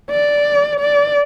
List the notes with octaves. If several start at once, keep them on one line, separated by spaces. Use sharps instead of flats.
D5
D5